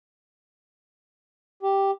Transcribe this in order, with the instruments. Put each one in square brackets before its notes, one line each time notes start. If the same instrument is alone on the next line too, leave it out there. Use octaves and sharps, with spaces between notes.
[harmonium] G4